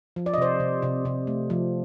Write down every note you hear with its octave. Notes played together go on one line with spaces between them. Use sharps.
F3
D5
D#5
C3 C5 D5
C3
C3
C3
A3
F3